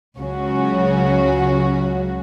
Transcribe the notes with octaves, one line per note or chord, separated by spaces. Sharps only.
C#2 C#3 F#3 C#4 F#4